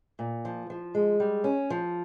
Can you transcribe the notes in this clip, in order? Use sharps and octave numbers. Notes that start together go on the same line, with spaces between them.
A#2
F3
F3
G#3
G3
C#4
F3